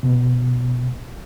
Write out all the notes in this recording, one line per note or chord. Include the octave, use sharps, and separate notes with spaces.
B2